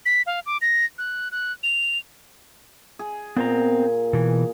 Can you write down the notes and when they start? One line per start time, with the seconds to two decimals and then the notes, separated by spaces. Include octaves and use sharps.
0.05 B6
0.26 F5
0.46 D6
0.61 A#6
0.98 F#6
1.32 F#6
1.63 F7
2.99 G#4
3.36 A#2 B3 C4 A#5
4.13 B2 E3